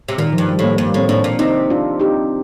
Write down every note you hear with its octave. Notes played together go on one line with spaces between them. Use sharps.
C3
A#2 D#3
G2 F3
G3
A2 G3 A#3
G2 G3 A#3
A2 C4
A2 A#3 D4
A#2
C3 C4 D#4
D4 F4
D#4 G4